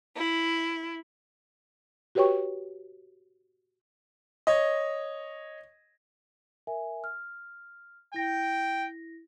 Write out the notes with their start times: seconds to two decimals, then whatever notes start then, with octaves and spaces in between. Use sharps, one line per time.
0.17 E4
2.15 F#4 G4 B4 C#5 G5 C#6
4.47 C#5 D#5
6.67 A#4 E5 G#5
7.04 F6
8.14 E4 G5 A#6